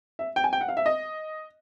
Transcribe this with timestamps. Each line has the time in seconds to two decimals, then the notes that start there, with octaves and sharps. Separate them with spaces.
0.19 E5
0.36 G5
0.44 G#5
0.53 G5
0.61 F#5
0.68 F5
0.77 E5
0.86 D#5